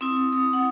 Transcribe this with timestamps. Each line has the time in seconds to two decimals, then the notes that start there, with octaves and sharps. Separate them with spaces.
0.01 C4 E4 D#6
0.32 D#6
0.53 F#5